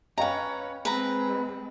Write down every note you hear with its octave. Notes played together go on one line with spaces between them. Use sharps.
C#4 B4 C#5 D#5 F5 G5 A#5
G#3 C4 B4 A#5